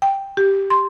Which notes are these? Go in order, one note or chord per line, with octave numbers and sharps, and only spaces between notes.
G5
G4
C6